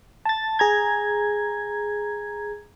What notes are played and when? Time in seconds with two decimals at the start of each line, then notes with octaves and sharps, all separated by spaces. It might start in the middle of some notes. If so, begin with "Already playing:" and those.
0.25 A5 A6
0.59 G#4 A#5 G#6